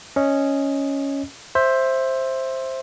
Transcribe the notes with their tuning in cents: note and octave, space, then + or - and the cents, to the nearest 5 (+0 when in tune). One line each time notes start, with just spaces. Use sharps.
C#4 +0 D#5 +0
C5 +10 E5 +0